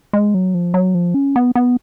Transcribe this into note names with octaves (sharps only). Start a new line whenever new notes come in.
G#3
F#3
F3
F#3
F3
C#4
B3
B3